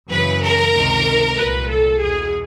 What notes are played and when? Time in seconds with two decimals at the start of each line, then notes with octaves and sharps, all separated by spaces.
0.10 F#2 C#3 E3 B4
0.43 A#4
0.73 C#2 C3 D#3
1.37 C2 A#2 B4
1.69 A4
2.00 E2 B2 G#4